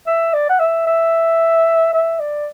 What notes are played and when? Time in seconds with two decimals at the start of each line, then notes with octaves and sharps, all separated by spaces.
0.07 E5
0.33 D5
0.49 F#5
0.60 E5
0.87 E5
1.93 E5
2.20 D5